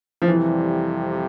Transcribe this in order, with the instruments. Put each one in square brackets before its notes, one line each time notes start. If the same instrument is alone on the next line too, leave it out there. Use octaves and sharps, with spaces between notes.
[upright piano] F3
[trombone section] F2 C3 G3 [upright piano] E3